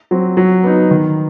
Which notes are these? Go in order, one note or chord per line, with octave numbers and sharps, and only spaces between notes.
F#3 C4
F#3
B3 D#4
D#3